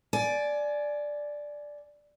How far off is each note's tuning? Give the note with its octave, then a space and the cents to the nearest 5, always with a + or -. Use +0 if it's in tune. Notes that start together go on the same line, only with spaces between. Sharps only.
D5 +0 G#5 +25